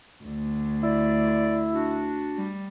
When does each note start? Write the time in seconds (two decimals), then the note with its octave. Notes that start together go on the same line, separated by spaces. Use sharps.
0.24 D2 D3
0.83 E4 D5
1.71 D4 F#4
2.37 G3